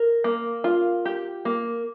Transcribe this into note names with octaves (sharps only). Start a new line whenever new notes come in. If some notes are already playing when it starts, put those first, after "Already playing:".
Already playing: A#4
A#3
F4
G4
A#3